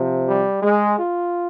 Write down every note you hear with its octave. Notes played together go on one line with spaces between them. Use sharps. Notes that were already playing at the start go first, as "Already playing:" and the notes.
Already playing: C3 F3
G3
G#3
F4